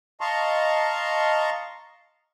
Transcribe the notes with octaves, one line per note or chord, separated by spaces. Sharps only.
D#5 F5 A5 A#5 C6 C#6